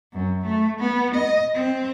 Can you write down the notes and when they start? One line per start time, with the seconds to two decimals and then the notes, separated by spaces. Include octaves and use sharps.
0.12 F#2
0.45 A3
0.80 B3
1.15 D#5
1.54 C4